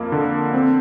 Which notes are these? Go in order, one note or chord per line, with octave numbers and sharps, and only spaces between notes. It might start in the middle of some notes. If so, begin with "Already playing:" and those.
Already playing: F2 A#3
D3
C4